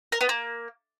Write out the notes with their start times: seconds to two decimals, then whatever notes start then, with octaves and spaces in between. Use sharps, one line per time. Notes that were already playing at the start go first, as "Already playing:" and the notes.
0.12 A#4
0.21 B3
0.29 A#3